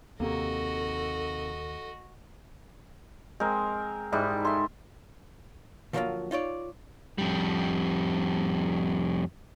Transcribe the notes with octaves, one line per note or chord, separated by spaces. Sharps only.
D#2 C3 D#3 A#3 F#4 A4 D#5
G#3 C4 A#4
G#2 G3 G#3 E4
A4 E5 C6
D3 F3 F#3 A3 A#3 F4
D#4 F4 C#5 D5
F2 G3